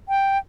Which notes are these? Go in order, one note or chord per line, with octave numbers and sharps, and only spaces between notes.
G5